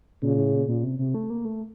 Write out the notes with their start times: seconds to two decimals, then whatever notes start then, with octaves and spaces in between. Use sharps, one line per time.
0.22 A#2 C#3
0.37 A2
0.53 A#2
0.68 A#2
0.84 C3
0.99 C3
1.14 A3
1.30 A#3
1.45 A3